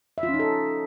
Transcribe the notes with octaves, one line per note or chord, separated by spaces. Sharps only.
E5
F4
C#4
D#4
A4